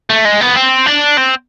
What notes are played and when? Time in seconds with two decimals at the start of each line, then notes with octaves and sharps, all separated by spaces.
0.10 A3
0.25 G#3
0.41 B3
0.56 C4
0.86 D4
1.18 C4